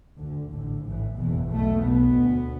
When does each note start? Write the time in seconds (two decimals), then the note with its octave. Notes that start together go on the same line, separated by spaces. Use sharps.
0.18 D2 D3
0.51 A1 A2 D3
0.84 A1 A2 E3
1.18 F#1 E2 B2 E3
1.50 B1 B2 A3
1.83 B1 B2 B3
2.16 D2